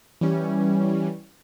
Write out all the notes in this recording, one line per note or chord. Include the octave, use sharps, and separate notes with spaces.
E3 G3 C#4